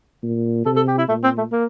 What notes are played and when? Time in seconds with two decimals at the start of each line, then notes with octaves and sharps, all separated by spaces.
0.23 A#2
0.66 C3 A4
0.76 A4
0.88 G4
0.98 E4
1.09 A#2 A3
1.24 C4
1.38 A3
1.52 A#3